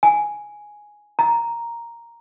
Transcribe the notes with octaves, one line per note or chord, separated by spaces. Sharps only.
G#5
A#5